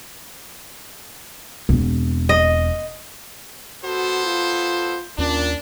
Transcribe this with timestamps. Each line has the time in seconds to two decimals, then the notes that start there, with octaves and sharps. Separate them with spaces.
1.69 E1 C4
2.29 D#5
3.84 B3 F#4 A4 C5
4.26 F4
5.18 D#2 A#2 C#4 D4